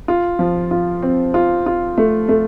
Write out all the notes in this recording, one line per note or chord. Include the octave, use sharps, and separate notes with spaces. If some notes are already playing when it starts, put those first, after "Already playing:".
F4
F3
F4
C4
F4
F4
A3
A3